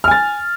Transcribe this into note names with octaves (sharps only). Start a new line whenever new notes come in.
G#5 F6 A6